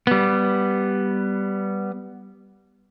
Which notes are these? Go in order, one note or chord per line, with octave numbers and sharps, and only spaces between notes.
G3 B3